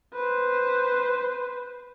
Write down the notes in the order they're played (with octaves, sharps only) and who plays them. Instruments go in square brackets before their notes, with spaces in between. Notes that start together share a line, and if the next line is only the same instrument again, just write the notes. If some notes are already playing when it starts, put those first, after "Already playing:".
[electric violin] B4 C5